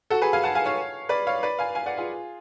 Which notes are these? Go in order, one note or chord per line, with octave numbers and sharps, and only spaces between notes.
F#4 A4
G#4 B4
F5 G#5
F#5 A5
F5 G#5
C#5 F5
B4 D5
C#5 F5
B4 D5
F5 G#5
F5 G#5
D5 F#5
F4 G#4